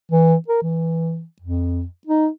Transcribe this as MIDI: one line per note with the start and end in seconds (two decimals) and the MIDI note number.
0.11 0.35 52
0.48 0.60 70
0.62 1.23 52
1.42 1.84 41
2.07 2.28 63